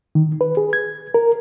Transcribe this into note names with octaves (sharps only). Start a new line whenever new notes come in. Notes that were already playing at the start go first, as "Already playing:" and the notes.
D#3
B4
G#4
G#6
A#4